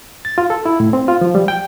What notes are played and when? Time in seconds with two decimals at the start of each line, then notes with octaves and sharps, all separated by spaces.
0.25 A6
0.38 F4
0.50 A4
0.66 E4
0.80 A2
0.93 C4
1.08 F4
1.21 F3
1.35 G3
1.48 G5